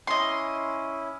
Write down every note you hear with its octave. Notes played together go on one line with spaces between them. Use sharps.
C#4 E4 D#5 C6